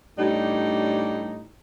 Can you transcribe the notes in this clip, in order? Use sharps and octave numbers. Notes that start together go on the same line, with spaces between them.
A2 G3 D4 D#4